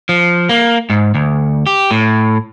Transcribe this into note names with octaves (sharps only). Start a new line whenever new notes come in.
F3
A#3
G#2
D2
G4
A2